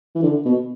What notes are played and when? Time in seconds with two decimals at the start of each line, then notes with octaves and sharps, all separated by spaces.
0.15 E3
0.23 D3
0.45 B2